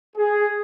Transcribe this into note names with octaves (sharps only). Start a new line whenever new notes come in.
G#4